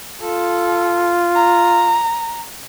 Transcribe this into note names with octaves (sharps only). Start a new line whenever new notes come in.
F4 A4
A#5